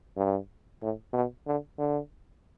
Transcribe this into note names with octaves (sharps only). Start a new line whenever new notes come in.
G2
A2
B2
D3
D3